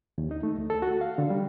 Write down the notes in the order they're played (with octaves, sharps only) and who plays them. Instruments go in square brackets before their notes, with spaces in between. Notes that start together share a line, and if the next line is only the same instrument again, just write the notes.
[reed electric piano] D#2
D#4
A3
D2
A4
F#4
F5
D3
G3